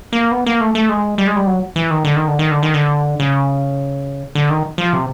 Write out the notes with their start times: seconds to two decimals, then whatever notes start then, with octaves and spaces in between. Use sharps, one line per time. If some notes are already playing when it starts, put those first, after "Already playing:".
0.13 A#3
0.31 B3
0.46 A#3
0.61 A3
0.75 A3
0.89 G#3
1.18 G3
1.27 G#3
1.36 G3
1.47 F#3
1.76 E3
1.91 D#3
2.04 D3
2.16 D#3
2.28 D3
2.39 D#3
2.51 D3
2.63 D#3
2.74 D3
3.20 C#3
4.35 D3
4.50 D#3
4.78 F3
4.93 C3